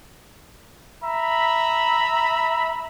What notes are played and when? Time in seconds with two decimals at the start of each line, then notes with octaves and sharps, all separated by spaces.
1.03 E5 A#5 B5